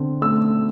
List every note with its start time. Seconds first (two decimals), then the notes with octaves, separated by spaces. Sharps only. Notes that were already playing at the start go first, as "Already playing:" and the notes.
Already playing: D3 C4
0.21 A3 E6